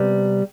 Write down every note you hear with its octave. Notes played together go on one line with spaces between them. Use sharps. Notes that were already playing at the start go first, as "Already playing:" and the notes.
Already playing: C3 G3 B3